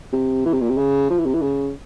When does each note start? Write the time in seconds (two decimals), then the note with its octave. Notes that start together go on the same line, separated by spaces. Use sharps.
0.13 C3
0.46 E3
0.53 C3
0.61 A#2
0.69 C3
0.78 C#3
1.10 F3
1.18 E3
1.26 C3
1.35 E3
1.42 C#3